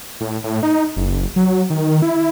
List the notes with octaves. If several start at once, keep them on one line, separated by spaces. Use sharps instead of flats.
A2
A2
D#4
F#1
F#3
D#3
E4